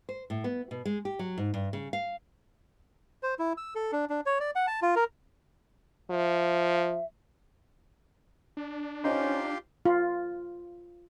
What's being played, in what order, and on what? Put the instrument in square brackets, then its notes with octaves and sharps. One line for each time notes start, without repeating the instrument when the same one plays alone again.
[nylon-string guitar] C5
A2
B3
B2
G#3
G4
F#3
G#2
G2
C#3
F5
[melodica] C5
E4
E6
A4
D4
D4
C#5
D5
F#5
A5
F4
A#4
[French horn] F3 [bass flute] E5
[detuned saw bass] D4
[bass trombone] C#4 [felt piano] D#4 C5 [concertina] F4 G4 C6
[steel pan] F4